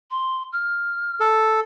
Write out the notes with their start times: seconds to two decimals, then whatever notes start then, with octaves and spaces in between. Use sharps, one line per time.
0.11 C6
0.53 F6
1.20 A4